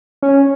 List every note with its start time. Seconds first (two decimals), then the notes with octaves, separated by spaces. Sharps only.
0.22 C#4